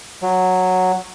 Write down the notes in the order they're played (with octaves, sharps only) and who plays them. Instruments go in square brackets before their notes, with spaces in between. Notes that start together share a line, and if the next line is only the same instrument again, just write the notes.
[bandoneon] F#3